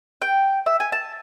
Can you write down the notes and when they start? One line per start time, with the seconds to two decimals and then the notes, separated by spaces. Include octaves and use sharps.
0.22 G5
0.66 E5
0.80 G#5
0.92 A5